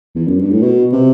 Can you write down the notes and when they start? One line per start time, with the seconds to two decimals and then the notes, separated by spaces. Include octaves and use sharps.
0.15 E2
0.28 F#2
0.39 G2
0.51 A2
0.63 B2
0.93 C3